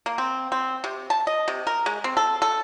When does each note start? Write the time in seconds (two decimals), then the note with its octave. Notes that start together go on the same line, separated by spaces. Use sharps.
0.06 A#3
0.18 C4
0.52 C4
0.84 C3
1.10 A5
1.27 D#5
1.48 C3
1.67 A#4
1.86 G#3
2.04 C4
2.17 A4
2.42 A4